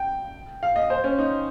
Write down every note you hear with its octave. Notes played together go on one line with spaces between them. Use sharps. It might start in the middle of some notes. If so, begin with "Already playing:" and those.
Already playing: G5
F5
D#5
C5
C#4
D#4